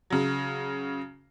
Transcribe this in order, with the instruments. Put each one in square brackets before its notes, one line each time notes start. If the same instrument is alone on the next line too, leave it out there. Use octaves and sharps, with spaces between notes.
[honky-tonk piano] C#3 F#3